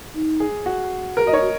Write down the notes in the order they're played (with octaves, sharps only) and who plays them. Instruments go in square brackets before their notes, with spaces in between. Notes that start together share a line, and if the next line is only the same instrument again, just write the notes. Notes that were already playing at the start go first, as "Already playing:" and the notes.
[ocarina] D#4
[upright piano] G#4
F#4
[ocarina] G#4 [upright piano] A#4
[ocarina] F#4 [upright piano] D#5
[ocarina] D#4 [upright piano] C#5
[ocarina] F#4